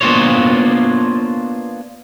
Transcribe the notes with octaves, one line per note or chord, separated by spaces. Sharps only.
A#3 B3 D4 F4 C5 C#5